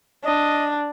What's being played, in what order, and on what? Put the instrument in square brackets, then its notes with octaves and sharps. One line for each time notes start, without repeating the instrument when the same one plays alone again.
[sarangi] D4 [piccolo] D#5